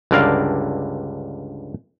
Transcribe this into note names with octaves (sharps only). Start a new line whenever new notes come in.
C#2 G2 D3 A#4 D5 F5